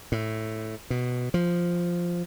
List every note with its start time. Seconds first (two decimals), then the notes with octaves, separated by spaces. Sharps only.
0.12 A2
0.90 B2
1.34 F3